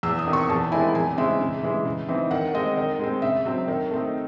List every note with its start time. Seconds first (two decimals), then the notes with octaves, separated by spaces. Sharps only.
0.03 E2 E6
0.19 D#6
0.27 C3 D#3
0.33 C#6
0.49 E2 A5
0.72 D#3 G#3 C4 E4 G#5
0.95 E2 G#5
1.17 C#3 G#3 C4 E5
1.40 C#3
1.63 E3 G#3
1.85 C#3
2.08 E3 C4 D#4
2.31 D#3 F#5
2.54 G#3 C4 D#5
2.77 D#3
2.99 G#3 C4
3.22 C#3 E5
3.46 F#3 C4
3.68 D#3
3.91 A3 C4 D#4